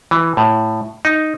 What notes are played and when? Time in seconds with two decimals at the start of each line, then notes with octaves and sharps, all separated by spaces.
0.11 E3
0.37 A2
1.05 D#4